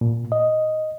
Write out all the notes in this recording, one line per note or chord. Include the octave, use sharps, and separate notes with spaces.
A#2
D#5